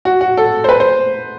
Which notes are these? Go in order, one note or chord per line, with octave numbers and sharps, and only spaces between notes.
F#4
F#4
A4
C5
B4
C5